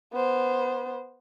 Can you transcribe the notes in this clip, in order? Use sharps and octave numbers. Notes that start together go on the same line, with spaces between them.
B3 C5